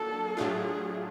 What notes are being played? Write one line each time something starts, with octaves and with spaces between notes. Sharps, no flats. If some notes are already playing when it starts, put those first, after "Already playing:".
Already playing: F#3 A#3 D4 A4
A2 F#3 A3 D4 F4 G#4